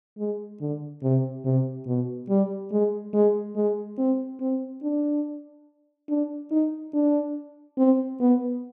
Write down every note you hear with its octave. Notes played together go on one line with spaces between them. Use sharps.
G#3
D3
C3
C3
B2
G3
G#3
G#3
G#3
C4
C4
D4
D4
D#4
D4
C4
B3